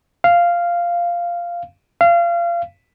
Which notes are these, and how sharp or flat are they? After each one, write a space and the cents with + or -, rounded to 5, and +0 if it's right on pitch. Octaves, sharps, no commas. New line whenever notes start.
F5 -10
F5 -30